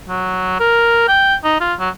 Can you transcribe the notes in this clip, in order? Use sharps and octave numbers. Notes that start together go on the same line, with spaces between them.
F#3
A#4
G5
D#4
F4
F#3